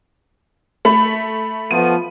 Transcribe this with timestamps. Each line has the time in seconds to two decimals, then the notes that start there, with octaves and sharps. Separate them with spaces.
0.85 A3 B5
1.71 F3 A3 B3 D#7